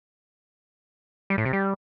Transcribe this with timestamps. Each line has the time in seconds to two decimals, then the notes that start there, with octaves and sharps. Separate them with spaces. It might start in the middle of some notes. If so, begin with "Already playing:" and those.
1.30 G3
1.38 A2
1.45 C3
1.53 G3